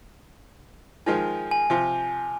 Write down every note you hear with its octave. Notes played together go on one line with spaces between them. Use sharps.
D#3 F3 G#3 G#5
G#5
C3 F3